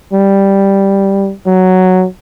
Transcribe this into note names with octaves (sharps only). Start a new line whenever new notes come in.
G3
F#3